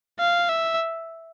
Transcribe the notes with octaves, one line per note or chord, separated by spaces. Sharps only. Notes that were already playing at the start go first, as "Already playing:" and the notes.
F5
E5